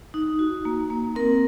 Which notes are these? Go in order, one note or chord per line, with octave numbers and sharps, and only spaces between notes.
D#4
F#4
A#3
A#3
C4 A#4